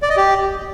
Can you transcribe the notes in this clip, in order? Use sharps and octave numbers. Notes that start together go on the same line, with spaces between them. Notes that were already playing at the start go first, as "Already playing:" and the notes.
D5
D#5
G4